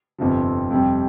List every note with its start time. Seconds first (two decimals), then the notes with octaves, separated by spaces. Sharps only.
0.18 G1 F2 C3 F3
0.70 F2 C3 G3